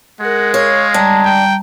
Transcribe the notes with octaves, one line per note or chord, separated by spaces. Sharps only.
G#3 G#4 A#4 F#5
C#5 F5
G3 D4 A#5
G5